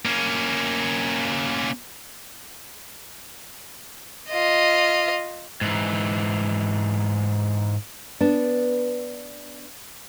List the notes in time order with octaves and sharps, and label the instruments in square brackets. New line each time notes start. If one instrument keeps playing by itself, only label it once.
[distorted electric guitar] A#3 C#4
[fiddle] F4 D#5
[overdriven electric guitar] G#2 E3
[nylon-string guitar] B3 D4